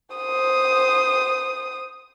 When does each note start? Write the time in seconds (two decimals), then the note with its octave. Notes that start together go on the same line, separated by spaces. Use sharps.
0.15 C5 D#6